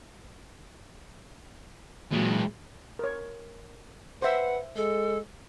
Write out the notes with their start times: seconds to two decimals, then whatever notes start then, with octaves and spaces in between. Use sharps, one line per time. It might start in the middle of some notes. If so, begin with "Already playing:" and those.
2.12 A#2 E3 F#3 G#3
2.99 A#4 C#5
4.22 B4 C5 E5 F#5
4.76 G#3 A4